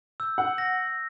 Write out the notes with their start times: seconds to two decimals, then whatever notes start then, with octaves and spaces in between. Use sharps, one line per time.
0.20 E6 G6
0.38 F#5
0.58 A#6